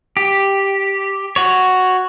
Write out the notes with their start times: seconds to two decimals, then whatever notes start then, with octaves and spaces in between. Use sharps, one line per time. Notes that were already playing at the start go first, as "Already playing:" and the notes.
0.17 G4
1.36 F#4 C#5